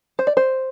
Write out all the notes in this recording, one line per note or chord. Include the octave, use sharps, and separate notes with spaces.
C5
D5
C5